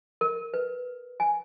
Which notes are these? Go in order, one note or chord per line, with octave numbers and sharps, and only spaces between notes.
A#4
B4
G#5